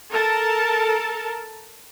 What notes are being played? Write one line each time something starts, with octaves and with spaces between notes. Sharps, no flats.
A4 A#4 A5